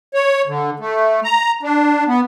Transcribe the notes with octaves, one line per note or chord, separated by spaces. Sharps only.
C#5
D3
A3
A#5
D4
B3